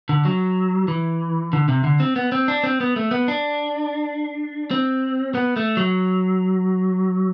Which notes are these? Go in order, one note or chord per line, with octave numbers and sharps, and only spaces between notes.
D3
F#3
E3
D3
C3
D3
C4
B3
C4
D4
C4
B3
A3
B3
D4
C4
B3
A3
F#3